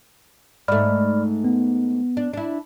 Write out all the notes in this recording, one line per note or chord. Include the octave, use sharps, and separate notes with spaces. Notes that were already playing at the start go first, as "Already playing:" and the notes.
G#2 A3 D5 B5 F6
B3
D4
D4 E4